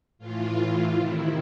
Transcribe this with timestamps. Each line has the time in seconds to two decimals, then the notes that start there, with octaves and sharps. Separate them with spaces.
0.19 A2 E3 F4
0.94 C3 D#3 E4